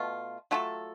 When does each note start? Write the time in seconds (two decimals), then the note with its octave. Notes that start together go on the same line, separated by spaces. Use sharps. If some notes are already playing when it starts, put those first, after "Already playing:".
Already playing: B2 A3 F4
0.51 F#3 A3 F4 A4